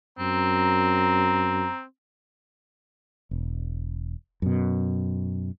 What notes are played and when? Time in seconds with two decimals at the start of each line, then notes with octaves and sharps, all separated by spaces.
0.19 F#2 C4 A#5
3.31 E1
4.42 F#2 B2